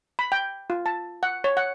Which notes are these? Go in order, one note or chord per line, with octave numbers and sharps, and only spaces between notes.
B5
G5
F4
A5
F#5
C#5
F#5